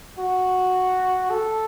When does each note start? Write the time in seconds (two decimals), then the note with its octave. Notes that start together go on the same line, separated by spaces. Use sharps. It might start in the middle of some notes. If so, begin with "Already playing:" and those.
0.19 F#4
1.30 A4